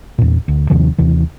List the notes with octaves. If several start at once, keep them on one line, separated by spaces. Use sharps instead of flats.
E2 A#2
D2
D#2 C3 D#3 F3
D#2 C3 E3